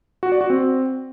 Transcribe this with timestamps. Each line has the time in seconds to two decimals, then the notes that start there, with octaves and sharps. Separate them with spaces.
0.23 F#4
0.32 D5
0.41 F#4
0.50 C4